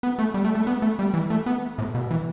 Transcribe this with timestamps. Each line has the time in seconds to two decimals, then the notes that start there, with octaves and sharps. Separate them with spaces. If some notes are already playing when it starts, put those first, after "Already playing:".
0.03 B3
0.19 A3
0.34 G3
0.45 A3
0.55 A3
0.67 B3
0.82 A3
0.99 G3
1.14 E3
1.30 A3
1.46 B3
1.78 A2
1.95 B2
2.11 E3